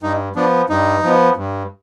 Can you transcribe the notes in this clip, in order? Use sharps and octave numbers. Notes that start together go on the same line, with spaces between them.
G2 D#4
F3 B3 D4
G2 D#4
F3 B3
G2